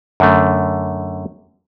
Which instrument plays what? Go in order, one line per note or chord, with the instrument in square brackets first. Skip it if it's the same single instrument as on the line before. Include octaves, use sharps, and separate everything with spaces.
[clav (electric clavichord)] F#2 D3 A3